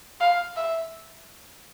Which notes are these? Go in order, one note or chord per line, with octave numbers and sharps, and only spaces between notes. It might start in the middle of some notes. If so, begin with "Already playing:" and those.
F5
E5